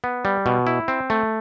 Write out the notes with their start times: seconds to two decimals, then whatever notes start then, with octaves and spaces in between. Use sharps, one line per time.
0.04 B3
0.25 G3
0.46 B2
0.67 E4
0.88 C4
1.10 A3